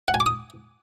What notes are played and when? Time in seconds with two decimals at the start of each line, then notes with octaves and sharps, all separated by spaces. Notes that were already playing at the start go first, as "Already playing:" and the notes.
0.08 F#5
0.14 G#5
0.20 D6
0.26 D#6